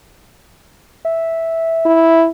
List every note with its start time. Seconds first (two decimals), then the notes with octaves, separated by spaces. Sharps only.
1.05 E5
1.85 E4